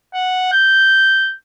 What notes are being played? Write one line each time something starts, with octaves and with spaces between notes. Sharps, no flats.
F#5
G6